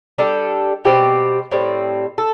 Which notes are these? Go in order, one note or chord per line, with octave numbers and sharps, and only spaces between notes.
G3 D4 A4
B2 G3 C4 G4
A2 G3 C4
A4